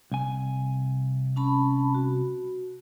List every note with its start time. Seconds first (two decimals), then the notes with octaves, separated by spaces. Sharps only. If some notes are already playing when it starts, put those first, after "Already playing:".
0.12 C2 G#5
1.36 C#4 A5 B5
1.94 F#4